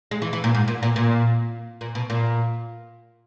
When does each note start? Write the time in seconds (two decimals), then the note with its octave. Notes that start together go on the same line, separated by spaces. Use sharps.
0.11 G#3
0.22 E3
0.33 E3
0.44 A#2
0.55 G#2
0.68 A#2
0.83 A#2
0.96 A#2
1.81 A#2
1.95 B2
2.10 A#2